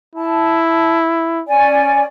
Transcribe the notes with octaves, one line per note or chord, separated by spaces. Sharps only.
E4 A5
C#4 D5 G#5